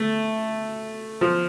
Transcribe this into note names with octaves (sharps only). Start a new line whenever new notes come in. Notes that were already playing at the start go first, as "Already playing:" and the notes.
Already playing: A3
F3